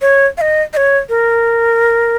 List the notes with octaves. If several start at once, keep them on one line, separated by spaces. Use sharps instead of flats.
C#5
F5
D#5
D#5
C#5
A#4